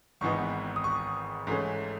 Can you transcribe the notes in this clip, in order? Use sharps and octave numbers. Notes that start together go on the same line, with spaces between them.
G#1 G#2 E3 B3 D#4 C#6
D#6
C#6
G#2 E3 A3 C#4